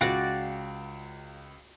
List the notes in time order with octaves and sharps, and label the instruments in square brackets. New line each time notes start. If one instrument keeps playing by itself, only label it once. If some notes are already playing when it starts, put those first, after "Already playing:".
[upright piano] C#2 [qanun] F#4 D5 [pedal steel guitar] F5 G5 F#6